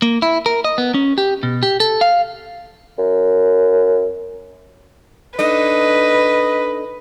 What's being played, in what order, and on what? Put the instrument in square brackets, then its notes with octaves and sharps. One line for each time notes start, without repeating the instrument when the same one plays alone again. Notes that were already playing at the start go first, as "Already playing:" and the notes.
[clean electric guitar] A#3
E4
A#4
D#5
B3
C#4
G4
B2
G4
A4
F5
[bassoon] F#2
[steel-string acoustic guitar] D4 D#4 A4 [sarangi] B4 [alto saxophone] D#5